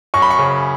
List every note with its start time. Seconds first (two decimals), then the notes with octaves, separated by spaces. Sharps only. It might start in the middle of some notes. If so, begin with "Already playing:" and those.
0.14 F#2 C#6
0.22 B5
0.30 C#6
0.39 C#3